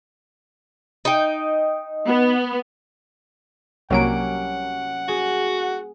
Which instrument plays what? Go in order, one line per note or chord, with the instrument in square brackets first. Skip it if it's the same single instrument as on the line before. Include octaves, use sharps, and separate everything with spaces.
[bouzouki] D#4 G5
[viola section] B3
[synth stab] C2 F#3 D7 [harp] G3 A#3 C#4 [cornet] F#5
[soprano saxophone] F#4 [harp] G#4